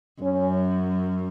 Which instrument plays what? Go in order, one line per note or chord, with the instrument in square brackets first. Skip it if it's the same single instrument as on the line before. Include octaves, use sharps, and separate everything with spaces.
[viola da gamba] F#2 [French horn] C#4